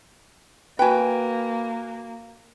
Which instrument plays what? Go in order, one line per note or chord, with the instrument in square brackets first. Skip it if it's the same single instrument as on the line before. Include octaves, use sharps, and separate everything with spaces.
[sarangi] A#3 [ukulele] F#4 G5 [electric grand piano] B4 G#5